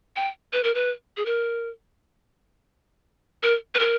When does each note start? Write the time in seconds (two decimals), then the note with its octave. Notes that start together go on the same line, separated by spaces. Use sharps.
0.16 G5
0.53 B4
0.64 A#4
0.75 B4
1.17 G#4
1.26 A#4
3.43 A#4
3.75 B4
3.79 A#4